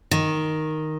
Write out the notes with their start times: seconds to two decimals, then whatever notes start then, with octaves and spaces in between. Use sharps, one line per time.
0.11 D#3